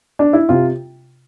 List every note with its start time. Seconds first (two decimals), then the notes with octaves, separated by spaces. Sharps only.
0.19 D4
0.33 E4
0.49 C3 F4